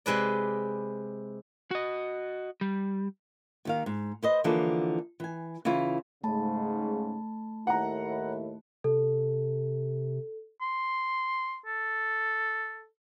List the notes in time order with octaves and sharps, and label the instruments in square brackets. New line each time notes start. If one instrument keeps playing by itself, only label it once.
[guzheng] C3 G#3 B4 D5
[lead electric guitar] F#4 D#5
G3
[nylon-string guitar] D#2 D#3 F5
G#2
B4 C5 D#5
D3 E3 F3 A#3 G#4 A4
E3 G#5
C#3 E3 E4 F4
[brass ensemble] G#2 C#3 [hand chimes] A3 A5 B5
[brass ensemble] D#2 A2 E4 [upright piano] F#5 A#5
[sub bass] C3 [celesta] A4
[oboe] C6
A4